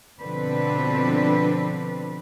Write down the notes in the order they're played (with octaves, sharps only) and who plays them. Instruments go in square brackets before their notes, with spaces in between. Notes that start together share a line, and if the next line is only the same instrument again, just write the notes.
[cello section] B2 D3 F3 C4 D4 B4